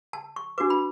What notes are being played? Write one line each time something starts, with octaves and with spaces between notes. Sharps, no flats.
A5
C#6
D4 F#4 B4 D6
B5